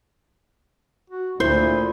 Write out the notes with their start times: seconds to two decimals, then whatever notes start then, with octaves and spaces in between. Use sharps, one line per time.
1.10 F#4
1.40 D2 A#2 E4 C5